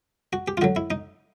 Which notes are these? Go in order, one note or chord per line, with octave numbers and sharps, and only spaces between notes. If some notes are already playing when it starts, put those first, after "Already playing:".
F#4
G4
F4
D3 F#3 F#4
E4
D#4